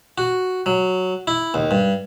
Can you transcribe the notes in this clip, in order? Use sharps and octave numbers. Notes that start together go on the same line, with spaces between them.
F#4
F#3
E4
D#2
G2